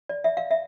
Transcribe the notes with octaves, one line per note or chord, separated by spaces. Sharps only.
D5
E5
F5
E5